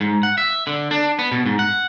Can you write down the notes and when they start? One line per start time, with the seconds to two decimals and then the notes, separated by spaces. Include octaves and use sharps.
0.01 G#2
0.23 F#5
0.38 E5
0.67 D3
0.91 D4
1.19 B3
1.32 B2
1.46 G#2
1.59 F#5